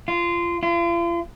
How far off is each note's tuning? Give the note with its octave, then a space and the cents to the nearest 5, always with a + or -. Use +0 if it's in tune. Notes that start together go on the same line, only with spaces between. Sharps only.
F4 -20
F4 -40